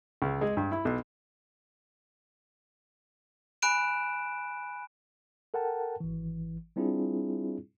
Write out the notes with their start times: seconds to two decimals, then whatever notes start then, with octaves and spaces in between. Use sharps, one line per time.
0.22 C#2
0.41 G#3
0.57 G2
0.72 E4
0.85 B1
3.62 G#5 B5 F#6 D7 E7
5.54 A4 A#4 F#5 G5 A5
6.00 G#1 E3
6.76 G3 C4 D4 E4 F4 G#4